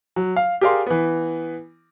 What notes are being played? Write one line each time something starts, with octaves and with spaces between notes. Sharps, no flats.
F#3
F5
G4 G#4 A#4 D5 F5 C6
E3 B3